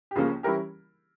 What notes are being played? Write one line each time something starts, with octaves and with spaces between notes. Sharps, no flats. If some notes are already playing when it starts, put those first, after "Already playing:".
G4
C#2 C#3 F3 A#3 C#4 F4 G#4
E3 G3 C#4 E4 G4 A#4